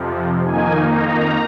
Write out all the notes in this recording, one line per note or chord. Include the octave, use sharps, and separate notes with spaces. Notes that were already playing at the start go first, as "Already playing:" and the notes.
Already playing: F2 C3 F3
F2 D#3 A#3 D#4 G#5
A#5